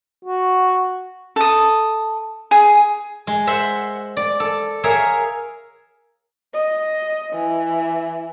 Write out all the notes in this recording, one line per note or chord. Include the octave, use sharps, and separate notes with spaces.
F#4
A4 D#6
G#4
G#3
C5 E5 F#5
D5
A4
G#4 A#4 C#5 E5 F5
D#5
E3